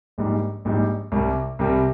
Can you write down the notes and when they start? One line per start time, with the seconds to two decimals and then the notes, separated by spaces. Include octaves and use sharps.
0.18 A#1 G#2 G3
0.65 A#1 G#2 G3
1.12 C2 C3 G3
1.59 C2 C3 G3